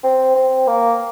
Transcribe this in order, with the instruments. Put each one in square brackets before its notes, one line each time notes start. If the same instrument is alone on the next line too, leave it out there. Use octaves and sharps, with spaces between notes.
[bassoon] C4
C4
A#3